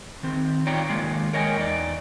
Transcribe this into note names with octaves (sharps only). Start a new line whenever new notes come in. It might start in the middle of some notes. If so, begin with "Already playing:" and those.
D#3 C4
D#4 F4 C#5 D5 G5 A#5
D#3 G#3 A#3 F4
A#4 C#5 D#5 G5 G#5
E2 D#4 D5